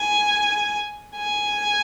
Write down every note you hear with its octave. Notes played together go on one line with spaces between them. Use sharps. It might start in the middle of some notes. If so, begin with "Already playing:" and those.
Already playing: G#5
G#5